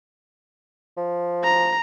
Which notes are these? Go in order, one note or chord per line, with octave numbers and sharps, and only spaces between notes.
F3
A#5